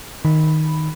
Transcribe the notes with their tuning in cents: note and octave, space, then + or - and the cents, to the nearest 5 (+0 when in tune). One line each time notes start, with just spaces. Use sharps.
D#3 +0 B5 +0